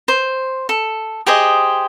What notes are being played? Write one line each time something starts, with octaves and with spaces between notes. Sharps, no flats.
C5
A4
G4 G#4 C5 D#5